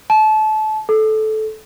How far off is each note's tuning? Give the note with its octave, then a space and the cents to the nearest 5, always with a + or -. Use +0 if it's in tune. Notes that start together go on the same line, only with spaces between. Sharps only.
A5 -25
A4 -15